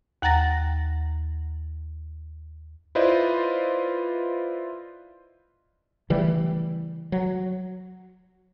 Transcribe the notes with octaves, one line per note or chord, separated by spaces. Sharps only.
D#2 F#5 A#5 A6 A#6
E4 F4 B4 C5 D5 D#5
C#3 E3 G3 A3
F#3